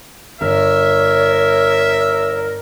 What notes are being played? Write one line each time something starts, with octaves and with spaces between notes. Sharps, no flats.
G1 A#4 C#5 E5 F6